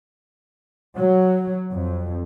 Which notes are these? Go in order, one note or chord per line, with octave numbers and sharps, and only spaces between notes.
F#3
F2